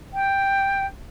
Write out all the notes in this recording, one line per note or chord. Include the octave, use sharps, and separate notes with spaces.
G5